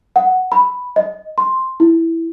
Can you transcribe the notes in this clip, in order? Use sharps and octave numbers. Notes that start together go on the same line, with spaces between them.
F#5
B5
D#5
C6
E4